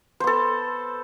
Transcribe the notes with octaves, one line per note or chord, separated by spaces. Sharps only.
B3 A4 C5